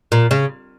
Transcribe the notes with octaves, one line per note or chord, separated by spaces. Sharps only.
A#2
C#3